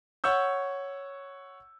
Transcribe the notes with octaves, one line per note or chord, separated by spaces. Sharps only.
C#5 F#5 C#6 E6 G6